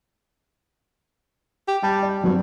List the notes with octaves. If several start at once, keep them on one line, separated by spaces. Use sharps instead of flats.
G4
G3 A5
D5
G2 F#3 C4